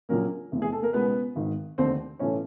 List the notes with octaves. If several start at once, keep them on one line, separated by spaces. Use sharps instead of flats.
A#1 A#2 F#3 A#3 C#4 A#4
F1 E2 C3
G#4
A4
A#3 A#4
C#2 B2 G#3 B3 B4
G#1 G#2 D#3
F1 D#2 D3 C4 C5
B1 A2 E3 A3 C#4 C#5